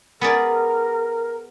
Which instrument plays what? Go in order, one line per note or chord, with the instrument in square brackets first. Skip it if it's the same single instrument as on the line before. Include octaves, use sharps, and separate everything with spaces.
[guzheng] B3 G#4 D5 [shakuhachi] A#4